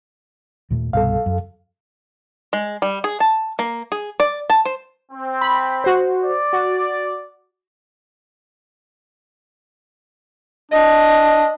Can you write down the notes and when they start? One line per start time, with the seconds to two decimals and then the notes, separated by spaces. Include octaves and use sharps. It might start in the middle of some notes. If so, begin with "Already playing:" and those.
0.70 D#2 A#2 A3
0.93 C2 G2 B2 A4 F5
1.26 F#2
2.53 G#3
2.82 G3
3.04 G#4
3.20 A5
3.59 A#3
3.92 G#4
4.20 D5
4.50 A5
4.65 C5
5.12 C4
5.41 B5
5.84 F#4 C5
6.22 D5
6.53 F#4
10.72 D4 D#5